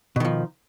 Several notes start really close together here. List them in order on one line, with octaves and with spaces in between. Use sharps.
B2 D#3 F3